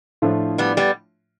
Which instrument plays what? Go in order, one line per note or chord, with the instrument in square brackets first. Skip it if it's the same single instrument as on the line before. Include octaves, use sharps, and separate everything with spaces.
[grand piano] A2 F3 A3 D4 F4
[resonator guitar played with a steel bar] G3 B3
G3 B3